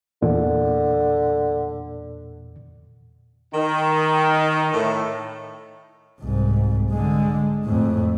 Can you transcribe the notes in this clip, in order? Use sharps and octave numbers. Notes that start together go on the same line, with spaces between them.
E2 A#2 D3
D#3
A2
C2 G#2
D3 G#3
F2 A2